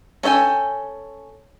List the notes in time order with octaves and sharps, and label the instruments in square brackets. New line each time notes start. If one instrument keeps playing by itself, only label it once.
[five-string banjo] C#4 A4 E5 G5 G#5